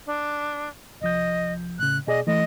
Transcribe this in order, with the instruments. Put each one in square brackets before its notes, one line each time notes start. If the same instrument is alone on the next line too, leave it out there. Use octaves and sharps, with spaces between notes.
[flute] D4
[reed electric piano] C2 F3 G6 [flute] D#5
[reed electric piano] A2 C#3 [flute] F#6
[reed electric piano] B2 G#4 D5 [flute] D#5
[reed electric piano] E3 A3 [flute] D#5